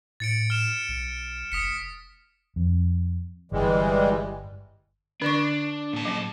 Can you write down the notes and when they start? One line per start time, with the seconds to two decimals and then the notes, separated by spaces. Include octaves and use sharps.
0.20 A2 A6 C#7 D7
0.50 F6 E7
0.88 B1
1.52 F1 D#6 B6 C#7
2.56 F2
3.52 G1 E3 G3 G#3
5.22 D3 D4 D5 C#6
5.93 A#2 A5
6.05 F#3 C#4